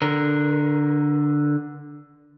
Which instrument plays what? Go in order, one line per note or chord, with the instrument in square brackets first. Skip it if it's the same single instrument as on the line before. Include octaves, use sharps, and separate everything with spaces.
[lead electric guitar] D3 A#4